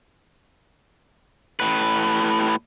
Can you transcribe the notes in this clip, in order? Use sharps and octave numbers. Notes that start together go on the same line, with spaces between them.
A2 B4